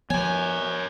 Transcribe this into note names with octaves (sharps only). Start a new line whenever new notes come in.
F3 B3 A#4 C#5 G#5